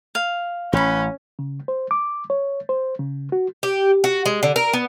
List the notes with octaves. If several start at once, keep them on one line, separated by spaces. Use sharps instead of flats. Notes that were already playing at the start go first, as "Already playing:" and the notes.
F5
A1 C#4 B4 B5
C#3
C5
D6
C#5
C5
C#3
F#4
G4
F#4
G#3
D3
A#4
B3